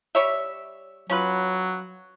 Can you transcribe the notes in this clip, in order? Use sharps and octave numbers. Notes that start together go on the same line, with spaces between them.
G3 C#5 E5
F#3 C#4 F4 B4